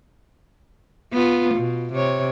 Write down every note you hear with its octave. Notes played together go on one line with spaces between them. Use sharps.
B3 F4
B2
C3 C#5